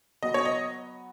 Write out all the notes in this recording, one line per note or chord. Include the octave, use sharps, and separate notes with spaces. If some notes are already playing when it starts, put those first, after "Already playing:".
F#3 B3 F#4 D#5
C#5
D#5